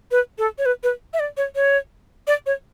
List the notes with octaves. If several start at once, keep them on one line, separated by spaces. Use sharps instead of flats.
B4
A4
C#5
B4
B4
E5
D5
C#5
C#5
D5
C#5